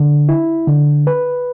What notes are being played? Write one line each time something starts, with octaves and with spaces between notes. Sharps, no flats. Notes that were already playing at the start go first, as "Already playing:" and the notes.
Already playing: D3
E4
D3
B4